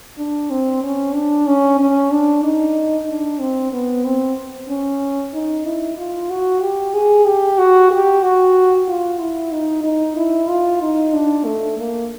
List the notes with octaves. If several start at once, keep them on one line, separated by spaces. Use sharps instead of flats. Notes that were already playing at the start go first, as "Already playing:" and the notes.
D4
C4
C#4
D4
C#4
C#4
D4
D#4
D4
C4
B3
C4
C#4
D#4
E4
F4
F#4
G4
G#4
G4
F#4
G4
F#4
F4
E4
D#4
D#4
E4
F4
D#4
D4
A3
A#3